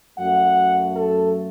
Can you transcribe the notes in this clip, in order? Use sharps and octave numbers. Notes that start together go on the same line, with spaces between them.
F#2 F#3 A3 F#5
A4